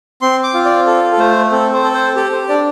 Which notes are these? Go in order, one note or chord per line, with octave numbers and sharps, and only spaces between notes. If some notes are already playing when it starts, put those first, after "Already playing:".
C4 C6
D6
F4
D5
A4
A4
A3 C5
C4 A4
C5
A4
C5
G4 A4
C5
D4 D5